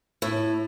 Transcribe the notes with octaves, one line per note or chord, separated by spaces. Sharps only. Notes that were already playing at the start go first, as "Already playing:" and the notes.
A2